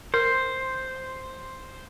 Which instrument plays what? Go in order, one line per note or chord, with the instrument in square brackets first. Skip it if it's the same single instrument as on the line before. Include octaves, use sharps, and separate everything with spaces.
[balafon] A#4 [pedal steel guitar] C5